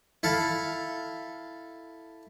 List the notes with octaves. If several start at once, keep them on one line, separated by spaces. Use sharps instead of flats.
E4 A4 F5